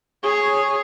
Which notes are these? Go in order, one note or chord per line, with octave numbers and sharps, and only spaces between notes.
G#4 C#5